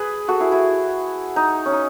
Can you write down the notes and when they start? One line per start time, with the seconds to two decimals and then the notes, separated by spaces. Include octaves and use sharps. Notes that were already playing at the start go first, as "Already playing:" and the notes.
Already playing: G#4 B4
0.28 F#4 A4
0.40 E4 G#4
0.52 E4
1.36 D#4
1.66 C#4
1.72 D#4